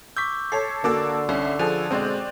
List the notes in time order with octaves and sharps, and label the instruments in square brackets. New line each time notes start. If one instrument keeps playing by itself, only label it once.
[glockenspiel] C#6 D6 E6 [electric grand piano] G6 B6
[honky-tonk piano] A4 C#5 [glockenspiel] C7
[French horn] D3 [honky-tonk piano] A#3 F#4 A4 [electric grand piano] A5 D6 E6
[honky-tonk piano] C2 [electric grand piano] C#4
[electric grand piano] F3 [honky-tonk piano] G#4 A4 [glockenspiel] F#6 D#7 F7
[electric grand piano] B2 G#3 [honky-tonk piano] C4 C5 D5